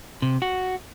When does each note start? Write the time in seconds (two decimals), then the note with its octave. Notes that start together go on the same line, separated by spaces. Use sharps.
0.22 C3
0.42 F#4